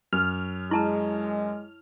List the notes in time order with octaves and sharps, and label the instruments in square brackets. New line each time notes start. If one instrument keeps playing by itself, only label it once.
[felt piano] F#2 [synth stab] F6
[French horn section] G#3 [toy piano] E4 A5 A#5